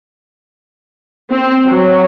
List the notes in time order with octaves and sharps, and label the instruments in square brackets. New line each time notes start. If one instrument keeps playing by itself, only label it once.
[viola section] C4
F#3